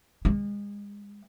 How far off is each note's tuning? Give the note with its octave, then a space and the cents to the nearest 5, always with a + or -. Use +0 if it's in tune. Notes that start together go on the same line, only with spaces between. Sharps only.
G#3 -35